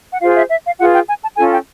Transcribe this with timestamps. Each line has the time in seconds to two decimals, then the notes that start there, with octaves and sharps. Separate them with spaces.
0.12 F#5
0.21 F4 G#4 C5 F5
0.37 E5
0.50 E5
0.66 F5
0.80 F4 G#4 B4 F#5
0.94 G5
1.08 G#5
1.23 A5
1.37 C#4 F4 A4 G#5
1.52 G5